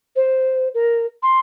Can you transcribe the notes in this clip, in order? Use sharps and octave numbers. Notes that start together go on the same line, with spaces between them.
C5
A#4
C6